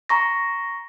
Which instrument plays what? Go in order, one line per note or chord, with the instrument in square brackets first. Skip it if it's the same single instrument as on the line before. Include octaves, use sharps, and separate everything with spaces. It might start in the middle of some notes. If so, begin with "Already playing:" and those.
[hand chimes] A#5 C#6 A#6